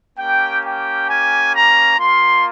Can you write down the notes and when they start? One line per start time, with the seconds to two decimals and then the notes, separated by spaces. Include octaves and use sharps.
0.17 A#3 C#4 G4 G5
0.62 G5
1.08 G#5
1.52 A#5
1.97 A#3 F4 C6